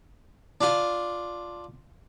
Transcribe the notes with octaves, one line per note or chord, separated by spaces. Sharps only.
D4 F4